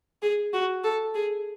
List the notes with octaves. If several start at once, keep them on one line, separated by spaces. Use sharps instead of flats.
G#4
F#4
A4
G#4